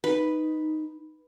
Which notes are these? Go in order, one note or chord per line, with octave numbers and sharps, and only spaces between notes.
D#4 B4